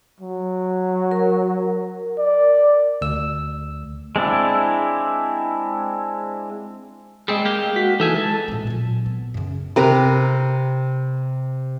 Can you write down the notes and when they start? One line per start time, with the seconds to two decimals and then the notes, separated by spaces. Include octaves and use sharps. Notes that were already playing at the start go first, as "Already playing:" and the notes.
0.20 F#3
1.11 A#4
2.19 D5
3.01 D2 E6
4.16 G#3 C4 D4 E4
7.28 G3 G#3 C4 G#4
7.45 A#3 G4
7.76 F#4 B6
8.00 E3 D#4 A4 E5 G#5
8.16 G#3 A5
8.48 A#2 C4
8.67 A#2 F#3
9.06 B3
9.34 F#2 C#3
9.76 C3 A#4 B4 A#5